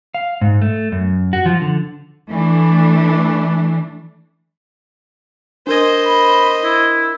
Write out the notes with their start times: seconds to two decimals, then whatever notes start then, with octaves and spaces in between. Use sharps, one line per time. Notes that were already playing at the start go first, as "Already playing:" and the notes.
0.15 F5
0.41 G#2
0.62 A3
0.92 F#2
1.33 F#4
1.46 F3
1.62 D3
2.29 E3 A3 D4
5.67 D4 A#4 C5 D#5 G#6
6.05 B5
6.64 E4